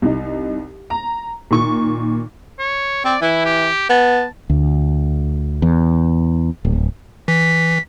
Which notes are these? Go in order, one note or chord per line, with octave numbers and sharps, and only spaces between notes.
C2 D#4
A#5
A#2 D#3 C#6
C#5
C4 D5
E3 E4
G4
B3 A5
D2
E2
D1
E3 B6